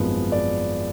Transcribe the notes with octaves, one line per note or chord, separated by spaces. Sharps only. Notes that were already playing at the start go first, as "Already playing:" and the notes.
Already playing: G#1 F#2 F3 G#3 B3
D5